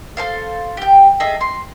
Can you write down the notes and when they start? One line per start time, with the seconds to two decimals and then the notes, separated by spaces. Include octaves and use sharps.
0.17 A4 C5 F5
0.77 G4 G5
1.20 G#4 A4 D#5 E5
1.41 C6